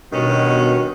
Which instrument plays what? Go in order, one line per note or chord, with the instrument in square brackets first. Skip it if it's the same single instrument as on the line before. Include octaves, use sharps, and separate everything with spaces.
[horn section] G2 D#3 C#4 [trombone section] B2